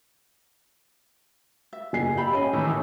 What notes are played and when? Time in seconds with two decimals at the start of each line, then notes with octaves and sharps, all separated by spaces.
1.73 E5
1.93 F#1 G#5 C7
2.17 G4 A4 B5
2.33 C#4 D#5 G#5
2.53 A2 D#3 E3